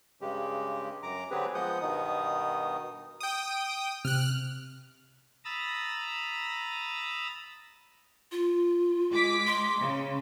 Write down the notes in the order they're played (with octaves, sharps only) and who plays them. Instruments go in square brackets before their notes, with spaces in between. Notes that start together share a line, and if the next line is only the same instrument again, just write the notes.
[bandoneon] G2 C#3 G#3 G4
F#2 A#5 D6
D3 F#3 C4 G4 G#4 B4
F3 G#3 B3 F#5 D#6 G6
G2 B2 D#3 B3 D#4 D#6
[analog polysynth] G5 D#6
[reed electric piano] C3 [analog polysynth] F6 F#6
[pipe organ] A#5 B5 D#6 E6 A6
[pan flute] F4
[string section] G#3 D6 B6
[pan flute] C6
[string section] C#3